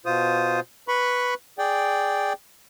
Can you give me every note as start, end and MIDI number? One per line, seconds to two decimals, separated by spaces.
0.06 0.60 47
0.06 0.60 65
0.06 0.60 72
0.06 0.60 87
0.88 1.34 71
0.88 1.34 83
0.88 1.34 85
1.59 2.33 68
1.59 2.33 74
1.59 2.33 79